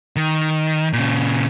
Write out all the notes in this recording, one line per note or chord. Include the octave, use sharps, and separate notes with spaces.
D#3
A#2 C#3